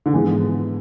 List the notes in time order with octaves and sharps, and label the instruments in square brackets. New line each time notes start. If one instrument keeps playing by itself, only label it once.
[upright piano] D3
[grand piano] G#2 F3 B3 F4 G#4 [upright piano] E3